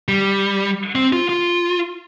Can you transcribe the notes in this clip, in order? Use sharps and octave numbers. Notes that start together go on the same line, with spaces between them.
G3
C4
F4
F4